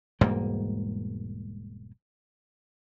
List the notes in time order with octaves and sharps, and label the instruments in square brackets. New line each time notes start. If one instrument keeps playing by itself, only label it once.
[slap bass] E1 G#2 G3 A#3